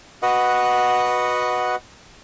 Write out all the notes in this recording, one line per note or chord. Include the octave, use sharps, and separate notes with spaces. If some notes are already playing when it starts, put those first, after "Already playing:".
F#4 B4 D#5 F#5